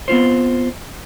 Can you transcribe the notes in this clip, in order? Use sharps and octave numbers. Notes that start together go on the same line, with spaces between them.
B3 C4 F4 C5